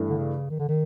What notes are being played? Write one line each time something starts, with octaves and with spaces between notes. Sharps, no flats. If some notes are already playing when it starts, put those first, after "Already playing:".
Already playing: G2 E3 A3
D3
C#3
D#3
D3
D#3